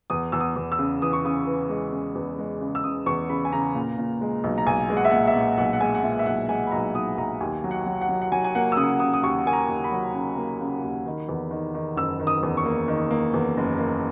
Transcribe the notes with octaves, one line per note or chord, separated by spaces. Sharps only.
E2 D#6
E2 E6
D#6
E2
E6
C#3
E3 D#6
C#6
C#3 D#6
E3
G#3
C#3
E2
G#3
C#3
E6
C#3 D#6
E2 C#6
C#3 B5
G#5
C#3 A#5
A#2
A#2
G#3
B1
A#5
B1 G#5
G#3
F#5
E5
A#2 F#5
E5
A#2
B1 F#5
F#5
G#3 G#5
F#5
A#2 E5
E5
B1 F#5
G#3 G#5
B5
B1 A#5
B1 D#6
B1 A#5
D#2 G#5
F#3
F#5
F#3
F#5
F#3
F#5
F#3 G#5
G#5
A#3 F#5
E6
C#3 D#6
C#3 D#6
D#6
D#2 C#6
A#3 G#5
A#5
D#2
B5
F#3
C#3
A#3
C#3
D#2
D#3
E2
D#3
D#3
F#1 E6
D#3
D#6
E2
C#6
A#3
D#3
A#3
E2
F#1
A#3